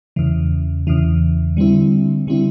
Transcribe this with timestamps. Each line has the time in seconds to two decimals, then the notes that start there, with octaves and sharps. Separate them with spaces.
0.16 E2 C#3 E3
0.87 E2 C#3 E3
1.57 D3 G3 C4 E4
2.27 D3 G3 C4 E4